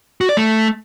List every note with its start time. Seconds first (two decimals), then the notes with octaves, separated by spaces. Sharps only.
0.21 F#4
0.29 D5
0.37 A3